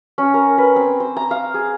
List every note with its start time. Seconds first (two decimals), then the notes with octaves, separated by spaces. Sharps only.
0.18 C#4
0.34 A#4
0.58 B4
0.76 C4
1.00 C5
1.17 A#5
1.31 F5
1.54 G#4